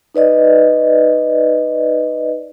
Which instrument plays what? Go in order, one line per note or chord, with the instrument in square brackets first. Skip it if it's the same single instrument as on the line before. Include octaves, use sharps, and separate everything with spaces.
[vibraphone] D#4 B4 D5 D#5